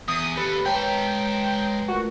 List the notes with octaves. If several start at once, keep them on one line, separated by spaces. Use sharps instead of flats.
E2 D#6
D#2 G4 A4 B4
G#3 B4 C#5 G5 A5 A#5
A3 F4 F#4 A#4